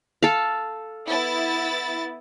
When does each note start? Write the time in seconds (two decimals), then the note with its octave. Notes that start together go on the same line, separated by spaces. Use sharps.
0.23 A4 F5
1.07 B3 E4 A6